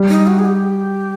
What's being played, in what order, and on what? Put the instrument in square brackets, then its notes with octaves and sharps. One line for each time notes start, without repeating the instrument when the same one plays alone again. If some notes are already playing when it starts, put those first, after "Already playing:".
Already playing: [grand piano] G3
[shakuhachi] D#4
F#4
G#4
G4